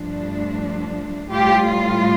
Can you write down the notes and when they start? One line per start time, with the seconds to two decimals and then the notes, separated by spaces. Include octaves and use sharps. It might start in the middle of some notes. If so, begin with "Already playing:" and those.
Already playing: G2 F3 A3 D4
1.29 A2 G3 F4 G4